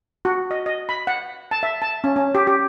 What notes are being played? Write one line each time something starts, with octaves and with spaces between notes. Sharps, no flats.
F#4
D#5
D#5
B5
F#5
A5
E5
A5
C#4
C#4
G4
G4